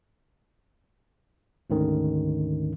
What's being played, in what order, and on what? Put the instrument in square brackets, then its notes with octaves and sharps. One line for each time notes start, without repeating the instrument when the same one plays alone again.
[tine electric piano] D2 G#2 D3 D#3 C#4